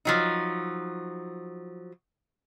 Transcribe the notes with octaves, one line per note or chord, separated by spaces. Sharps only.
F3 F#3 D#4